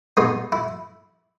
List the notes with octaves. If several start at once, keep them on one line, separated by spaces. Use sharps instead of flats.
B2 G#3 B3 D#4
E4